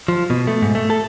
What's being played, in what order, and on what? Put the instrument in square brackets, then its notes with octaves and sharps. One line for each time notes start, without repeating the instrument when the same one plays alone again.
[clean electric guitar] F3
B2
A3
G#2
A3
A4